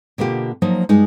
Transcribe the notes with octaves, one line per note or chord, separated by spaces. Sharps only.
B2 D3 A#3 F4 G4
F3 F#3 A#3 D#4
G2 G#3 D#4